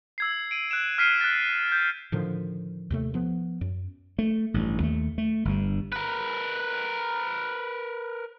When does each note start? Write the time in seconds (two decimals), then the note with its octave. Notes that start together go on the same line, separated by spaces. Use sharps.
0.18 E6 G#6 C7
0.51 D7 D#7
0.71 F#6 D7 E7
0.98 F6 B6 C7 D#7
1.21 F#6 A6
1.72 G6
2.12 A2 D3 D#3 F3
2.90 D#2 C3 A3
3.14 F3 B3
3.61 F#2
4.19 A3
4.54 A1 G2
4.80 D#2 A3
5.18 A3
5.45 G1 G2
5.92 A#4 B4